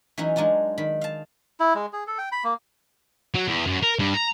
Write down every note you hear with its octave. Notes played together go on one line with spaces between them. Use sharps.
E3 F#3 C#4 D#4
F#3 G#3 D4 D#4 F4
D#3 B5
F5 A5
E4
G#3
G#4
A4
G5
B5
A#3
F#3
E2
F#2
A#4
G2
A#5